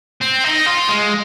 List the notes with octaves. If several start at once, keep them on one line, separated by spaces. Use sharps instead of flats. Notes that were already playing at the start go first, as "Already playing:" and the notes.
C4
D#4
F4
G#3